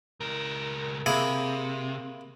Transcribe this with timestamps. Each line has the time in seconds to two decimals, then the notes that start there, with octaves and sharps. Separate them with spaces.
0.20 C#2 A#4
1.06 C3 A#3 E4 G#4